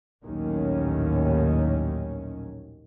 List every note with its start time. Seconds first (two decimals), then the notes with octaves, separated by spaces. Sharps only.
0.24 A#1 D#2 A2 D#3 F#3 C#4